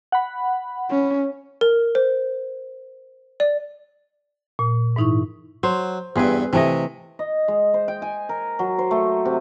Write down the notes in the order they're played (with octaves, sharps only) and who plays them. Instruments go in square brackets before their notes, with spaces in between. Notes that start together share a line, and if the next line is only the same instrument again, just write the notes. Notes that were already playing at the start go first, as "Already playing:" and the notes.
[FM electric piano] F#5 B5
[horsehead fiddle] C#4
[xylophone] A#4
C5
D5
[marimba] A#2
G#2 E3 D#4 E4 C#6
[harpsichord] F#3 [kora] C5
[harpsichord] E2 G2 [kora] C4 G#4 B4
[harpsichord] C3 [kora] E3 A3 D#5
[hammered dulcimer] D#5
G#3
C5
G5
G#5
A#4
F#3
C5
A3
C3